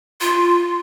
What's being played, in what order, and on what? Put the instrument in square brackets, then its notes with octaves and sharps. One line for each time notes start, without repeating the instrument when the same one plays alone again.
[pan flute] F4 [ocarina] C6